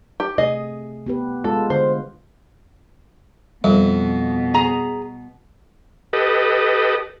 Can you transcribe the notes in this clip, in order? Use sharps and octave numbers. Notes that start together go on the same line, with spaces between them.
G4
C3 A3 G#4 D#5
B3 G4 B4
G#3 F4 A4
D3 C5
F2 B2 G3
G#4 A#5
G4 A4 B4 D#5